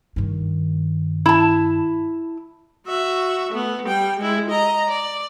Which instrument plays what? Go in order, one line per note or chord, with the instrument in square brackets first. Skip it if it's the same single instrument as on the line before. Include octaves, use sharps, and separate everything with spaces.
[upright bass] G2 D#3
[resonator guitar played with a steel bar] E4 A5
[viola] F#4 E5
A3 B3
G3 G5
G#3 E4
D#5 A#5
D5